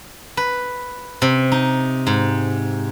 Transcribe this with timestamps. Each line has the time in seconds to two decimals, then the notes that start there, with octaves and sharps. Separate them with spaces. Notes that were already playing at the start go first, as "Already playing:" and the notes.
0.37 B4
1.22 C3
1.52 D#4
2.07 G#2